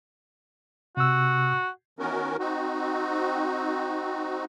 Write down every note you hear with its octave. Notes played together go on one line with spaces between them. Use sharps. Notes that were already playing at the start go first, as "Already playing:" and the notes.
C3 F#4 E6
D#3 E3 B3 C#4 F#4 A#4
C4 D#4 F#4